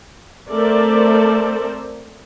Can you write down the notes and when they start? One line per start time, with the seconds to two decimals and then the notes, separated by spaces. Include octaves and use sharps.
0.51 A3 C4 A4 A#4 C5 D5